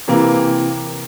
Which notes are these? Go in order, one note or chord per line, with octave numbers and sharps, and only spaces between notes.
C3 E3 A#3